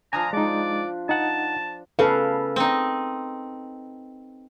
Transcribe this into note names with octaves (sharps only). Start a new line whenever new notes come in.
F3 D4 G#5 A#5 D#6 F6
G#3 D#4 D5
D#4 F#5 A5
C#3 A4 B4 F5
C4 D#4